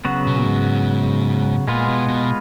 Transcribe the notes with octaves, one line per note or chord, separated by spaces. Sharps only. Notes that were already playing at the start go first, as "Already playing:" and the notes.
C#3 F#3 B3 F#4
B2
A#2
G#2
A#2 G#3 B3 F4
B2
B2